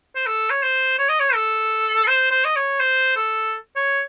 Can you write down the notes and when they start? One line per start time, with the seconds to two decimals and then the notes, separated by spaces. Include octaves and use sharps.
0.15 C5
0.27 A4
0.50 C#5
0.63 C5
0.99 C#5
1.09 D#5
1.20 C#5
1.34 A4
2.07 C5
2.31 C5
2.45 D#5
2.56 C#5
2.80 C5
3.16 A4
3.76 C#5